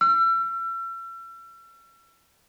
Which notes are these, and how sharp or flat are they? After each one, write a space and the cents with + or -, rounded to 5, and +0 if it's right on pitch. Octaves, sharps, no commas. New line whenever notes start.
E6 +40